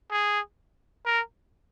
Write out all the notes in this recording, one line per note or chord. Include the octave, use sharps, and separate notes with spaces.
G#4
A#4